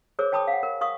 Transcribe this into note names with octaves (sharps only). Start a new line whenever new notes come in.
G#4 A#4 C5 C#5 D6
C#5 G5 A5 B5 D6 D#6
F5 F#5
A#4
A#4 F5 C#6 D#6